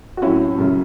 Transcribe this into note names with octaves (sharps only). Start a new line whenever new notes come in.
F#4
A2 F#3 C#4 E4
F#2 C#3 F#3